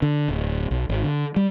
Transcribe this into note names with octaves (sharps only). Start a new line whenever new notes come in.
D3
D1
B1
G#1
D3
G3